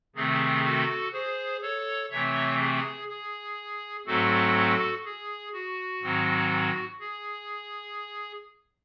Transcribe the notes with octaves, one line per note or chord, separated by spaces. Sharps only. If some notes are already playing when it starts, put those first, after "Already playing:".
C3 D#3 A3 C4 G#4
F#4 A4
G#4 C5
A4 C#5
C3 E3 A3 C4 C#5 E5
G#4
G#4
G#2 F#3 A3 C4 F#4 A4
G#4
F#4
G#2 D#3 F#3 C4
G#4